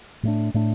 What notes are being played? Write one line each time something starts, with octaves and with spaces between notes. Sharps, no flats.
A2 A3 D4
A2 A3 D4